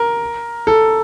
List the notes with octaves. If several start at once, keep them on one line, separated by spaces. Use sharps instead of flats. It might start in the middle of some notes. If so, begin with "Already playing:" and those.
Already playing: A#4
A4